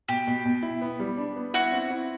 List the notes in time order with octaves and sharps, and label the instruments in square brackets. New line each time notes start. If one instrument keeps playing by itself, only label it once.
[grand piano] B2 [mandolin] G4
[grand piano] B2
B2
E4
B3
G3
D4
B3
[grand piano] E4 [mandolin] F#4
[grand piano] C4
E4